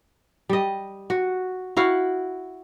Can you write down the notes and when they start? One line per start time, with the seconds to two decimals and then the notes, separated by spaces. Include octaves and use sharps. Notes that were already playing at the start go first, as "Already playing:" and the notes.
0.49 G3 D#5
1.10 F#4
1.77 E4 F#4 F5